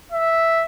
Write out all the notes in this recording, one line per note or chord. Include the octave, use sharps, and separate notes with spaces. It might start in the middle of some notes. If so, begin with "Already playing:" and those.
E5